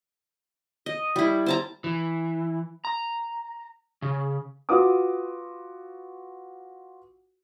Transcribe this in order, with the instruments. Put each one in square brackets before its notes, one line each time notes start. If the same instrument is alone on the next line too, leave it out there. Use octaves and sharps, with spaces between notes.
[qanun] D#5
G3 E4
C5 A5 A#5
[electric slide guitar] E3
A#5
C#3
[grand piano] F4 F#4 B4 D6 D#6